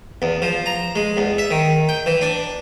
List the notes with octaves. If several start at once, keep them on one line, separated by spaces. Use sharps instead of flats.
E2
F3
A#5
G#3
E2
E5
D#3
G5
E3
D4